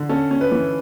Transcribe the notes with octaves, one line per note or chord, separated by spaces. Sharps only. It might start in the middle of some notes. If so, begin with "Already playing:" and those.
Already playing: D3
C#4 A4
C#4
B4
E3